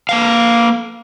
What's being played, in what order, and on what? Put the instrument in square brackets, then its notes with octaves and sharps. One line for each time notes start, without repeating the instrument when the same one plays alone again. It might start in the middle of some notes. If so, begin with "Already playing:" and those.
[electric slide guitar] A#3 B4 F5